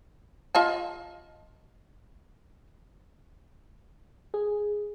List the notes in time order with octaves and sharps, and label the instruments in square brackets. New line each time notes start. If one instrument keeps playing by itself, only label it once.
[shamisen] F4 D#5 A5
[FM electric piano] G#4